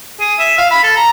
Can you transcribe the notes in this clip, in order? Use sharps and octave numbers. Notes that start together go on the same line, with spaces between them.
G#4
E5
F5
B5
A4
A#5